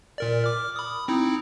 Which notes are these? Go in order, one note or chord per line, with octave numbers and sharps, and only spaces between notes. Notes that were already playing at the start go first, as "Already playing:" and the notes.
A#2 A#4 D5
D6 F6
B5 D#6
C4 D#4 E4